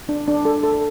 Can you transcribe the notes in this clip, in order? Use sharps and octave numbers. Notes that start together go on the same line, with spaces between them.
D4
D4
A4
A4